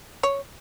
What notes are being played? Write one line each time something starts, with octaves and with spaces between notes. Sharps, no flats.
C#5